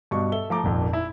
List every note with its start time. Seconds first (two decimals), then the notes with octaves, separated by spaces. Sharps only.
0.11 G2 B2 D#5 C#6
0.32 A4 E5 G7
0.50 F3 A3 A#5 D6
0.63 D#1 G#1 F2
0.93 E4